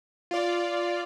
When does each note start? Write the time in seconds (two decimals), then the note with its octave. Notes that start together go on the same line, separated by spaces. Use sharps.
0.31 F4 D5